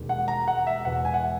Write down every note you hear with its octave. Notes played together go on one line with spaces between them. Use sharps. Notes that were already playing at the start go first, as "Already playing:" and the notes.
Already playing: E1 D#2 D#3 G#3
F#5
A#5
F#5
E5
E2 B2 G#3 F#5
G#5
F#5
E5